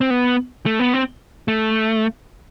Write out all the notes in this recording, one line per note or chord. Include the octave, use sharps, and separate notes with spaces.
C4
B3
A3
B3
C4
A3